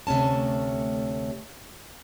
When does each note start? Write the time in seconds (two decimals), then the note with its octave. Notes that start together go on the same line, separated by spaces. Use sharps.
0.07 D2 C3 A3 C#4 A5